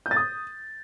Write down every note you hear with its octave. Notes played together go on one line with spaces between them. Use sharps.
G6
A6
D#6